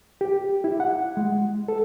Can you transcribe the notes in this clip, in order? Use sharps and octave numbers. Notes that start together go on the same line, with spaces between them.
G4
E4
F#5
G#3
A4